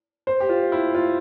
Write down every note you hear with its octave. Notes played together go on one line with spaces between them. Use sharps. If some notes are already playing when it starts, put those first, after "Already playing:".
C5
G4
F4
E4
F4